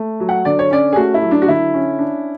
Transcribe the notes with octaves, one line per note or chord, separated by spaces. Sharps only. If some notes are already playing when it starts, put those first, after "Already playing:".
Already playing: A3
F#3
F#5
D3 D5
C#5
C#4 D5
G#4
A3 F#4
E4
F#3
D4
F#4
D3 E4
C#4
D4